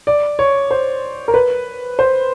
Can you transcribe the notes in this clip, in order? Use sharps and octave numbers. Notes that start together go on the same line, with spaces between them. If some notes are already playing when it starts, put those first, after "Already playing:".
D5
C#5
C5
A#4
B4
C5